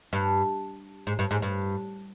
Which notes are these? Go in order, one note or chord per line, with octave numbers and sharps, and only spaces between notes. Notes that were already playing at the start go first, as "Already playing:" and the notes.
G2
G#2
G2
G#2
G2